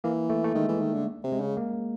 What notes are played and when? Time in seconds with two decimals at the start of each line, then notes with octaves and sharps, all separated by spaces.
0.04 E3 A#3
0.30 A3
0.44 A3
0.55 D#3 G#3
0.68 E3
0.81 D#3
0.94 D3
1.23 C3
1.32 G#3
1.40 C#3
1.57 A#3